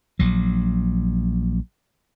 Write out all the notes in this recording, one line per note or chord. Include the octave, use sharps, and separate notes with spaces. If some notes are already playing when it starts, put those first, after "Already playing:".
A#1 F#3